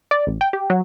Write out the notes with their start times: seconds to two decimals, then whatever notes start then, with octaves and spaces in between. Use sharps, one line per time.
0.11 D5
0.27 A1
0.41 G5
0.53 G4
0.70 F#3